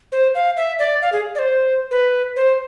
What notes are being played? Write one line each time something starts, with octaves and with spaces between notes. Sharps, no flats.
C5
F5
E5
D5
F5
G#4
D5
C5
B4
C5